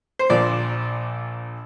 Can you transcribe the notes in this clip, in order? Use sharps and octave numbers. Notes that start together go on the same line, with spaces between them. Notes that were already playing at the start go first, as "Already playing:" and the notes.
C5
A#1 A#2 F3 D5